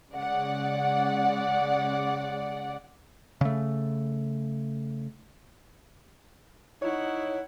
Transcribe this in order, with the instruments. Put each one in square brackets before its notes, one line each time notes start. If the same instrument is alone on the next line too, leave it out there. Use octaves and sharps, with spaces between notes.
[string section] C#3 G#3 D5 F#5
[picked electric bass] C#3 A3
[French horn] D#4 [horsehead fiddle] E4 F#5 [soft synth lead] C#5